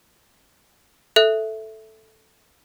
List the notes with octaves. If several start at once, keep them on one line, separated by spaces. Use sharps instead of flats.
A4 E5 F#6